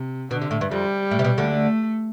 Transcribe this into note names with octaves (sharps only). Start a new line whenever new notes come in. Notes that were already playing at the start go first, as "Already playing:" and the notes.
Already playing: C3
B2 D3
C3
A2
G2
F2 G3
A2
C3
B2
D2 D3
A3